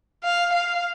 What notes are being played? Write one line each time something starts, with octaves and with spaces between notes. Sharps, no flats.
F5
F5